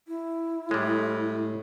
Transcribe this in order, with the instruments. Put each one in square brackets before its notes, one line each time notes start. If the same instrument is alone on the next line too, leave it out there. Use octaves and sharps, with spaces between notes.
[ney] E4
[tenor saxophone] A2 [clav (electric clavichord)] G3 G#3